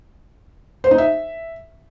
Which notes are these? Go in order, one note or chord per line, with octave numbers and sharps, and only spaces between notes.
C5
D#4
E5